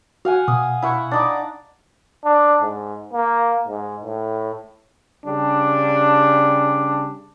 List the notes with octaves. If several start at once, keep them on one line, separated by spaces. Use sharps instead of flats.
F#4 F5 F#5 G#5
B2 D#6
E4 F#5 C#6
D4 D#4 D6
D4
G#2
A#3
G#2
A2
C#3 G3 D4